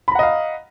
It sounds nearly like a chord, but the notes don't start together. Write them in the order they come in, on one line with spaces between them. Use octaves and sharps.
B5 A#5 F#5 D#5 F5